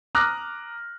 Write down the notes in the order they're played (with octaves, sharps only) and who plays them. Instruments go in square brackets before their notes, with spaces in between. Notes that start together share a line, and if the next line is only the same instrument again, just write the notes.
[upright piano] A#5 D6 D#6 F6 F#6 A#6